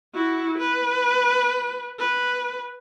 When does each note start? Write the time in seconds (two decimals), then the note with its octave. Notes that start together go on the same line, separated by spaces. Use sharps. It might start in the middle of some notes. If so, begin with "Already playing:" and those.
0.14 E4 F#4
0.58 B4
1.99 B4